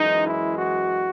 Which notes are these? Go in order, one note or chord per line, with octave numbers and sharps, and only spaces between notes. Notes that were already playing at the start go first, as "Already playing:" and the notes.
Already playing: F#2 E3 G#3 D#4
E4
F#4